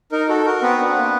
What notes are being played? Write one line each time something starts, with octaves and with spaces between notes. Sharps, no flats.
D#4 A#4
F#4 A4
F#4 A#4
B3 C4 B4
D4
A#3